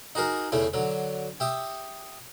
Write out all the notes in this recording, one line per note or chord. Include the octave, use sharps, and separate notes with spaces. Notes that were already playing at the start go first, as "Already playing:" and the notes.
D#4 F#4 G#4 A#4
E2 C#3 A3 E4
D3 F#3
G4 E5 D#6